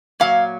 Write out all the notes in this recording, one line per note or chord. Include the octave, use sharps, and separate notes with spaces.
A#2 F#3 A#3 F5